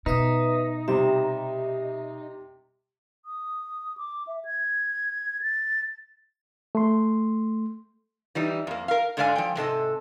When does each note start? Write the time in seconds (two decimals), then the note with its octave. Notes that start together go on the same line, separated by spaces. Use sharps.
0.06 B2 D#4 B4 E5 D#6
0.88 C3 G3 E5
3.25 D#6
3.97 D6
4.27 E5
4.45 G#6
5.42 A6
6.75 A3 C6
8.35 E3 G3 D#4
8.67 F2 A#3
8.88 A#4 F5
9.17 G#2 D3 G#3 D5 F5 G#5
9.36 F3 G5
9.55 G#2 C3 A4 D#5